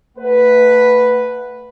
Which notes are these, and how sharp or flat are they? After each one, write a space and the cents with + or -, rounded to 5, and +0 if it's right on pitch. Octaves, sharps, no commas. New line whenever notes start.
A3 +25 B4 +0 F#5 +0